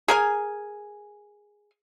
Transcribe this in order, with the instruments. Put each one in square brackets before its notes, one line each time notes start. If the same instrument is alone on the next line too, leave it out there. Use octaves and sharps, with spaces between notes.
[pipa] G#4 A#4 G#5